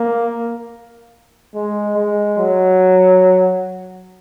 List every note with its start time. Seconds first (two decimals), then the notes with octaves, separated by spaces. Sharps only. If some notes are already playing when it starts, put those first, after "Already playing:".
Already playing: A#3
1.55 G#3
1.97 G#3
2.38 F#3